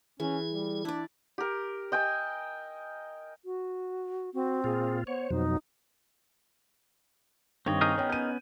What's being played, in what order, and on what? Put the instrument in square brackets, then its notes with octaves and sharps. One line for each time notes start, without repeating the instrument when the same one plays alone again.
[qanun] E3 [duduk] C#4 [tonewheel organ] G#4
[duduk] G3
[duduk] D4 [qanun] E4 D5
[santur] G4 A#4
D#5 G5 G#5 E6
[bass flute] F#4
[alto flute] C4 [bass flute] F#4
[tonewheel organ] A#2 F4 [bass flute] G#4
[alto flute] B3 [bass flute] C5 [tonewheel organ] C#5
[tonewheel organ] F2 B2 F#3 [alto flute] D#4
[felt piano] G2 D#3 G5 [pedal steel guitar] C4 C#5 D#5
[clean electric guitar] D#4 G#4 A#4
[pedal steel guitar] B3 C#4 [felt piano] C#5 G5
[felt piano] G6 D#7